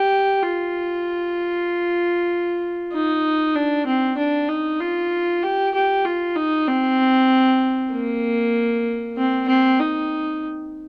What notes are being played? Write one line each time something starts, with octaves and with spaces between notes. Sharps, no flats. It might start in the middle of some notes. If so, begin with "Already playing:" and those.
Already playing: G4
F4
D#4
D4
C4
D4
D#4
F4
G4
G4
F4
D#4
C4
A#3
C4
C4
D#4